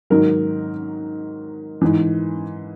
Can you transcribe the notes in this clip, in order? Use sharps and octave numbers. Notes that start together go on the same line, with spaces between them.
G#2 D#3 F#3 A#4
G#2 E3